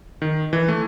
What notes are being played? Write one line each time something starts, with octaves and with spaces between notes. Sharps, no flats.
D#3
E3
A3